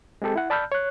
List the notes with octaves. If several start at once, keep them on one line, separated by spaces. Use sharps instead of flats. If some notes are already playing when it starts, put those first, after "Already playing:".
G#3 C4 G4 A4
E4 F#5
D5 A5 B5 E6 F6 G6
C#5 F#6